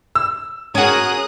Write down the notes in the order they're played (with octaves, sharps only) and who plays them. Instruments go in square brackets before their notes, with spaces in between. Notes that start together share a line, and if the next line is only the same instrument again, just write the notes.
[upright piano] E6
[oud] C#4 F#4 [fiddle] G#4 A#4 [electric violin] D#6 F#6